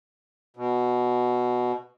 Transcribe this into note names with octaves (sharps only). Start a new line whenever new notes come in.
B2